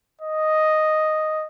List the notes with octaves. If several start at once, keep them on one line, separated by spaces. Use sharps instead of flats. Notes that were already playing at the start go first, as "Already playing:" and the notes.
D#5